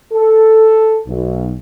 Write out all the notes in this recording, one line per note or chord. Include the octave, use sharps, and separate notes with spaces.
A4
B1